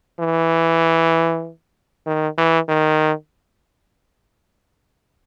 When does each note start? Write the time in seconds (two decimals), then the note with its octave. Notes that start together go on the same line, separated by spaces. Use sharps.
0.20 E3
2.06 D#3
2.38 E3
2.69 D#3